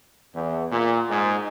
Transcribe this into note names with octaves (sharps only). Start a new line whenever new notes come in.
E2
A#2
G#2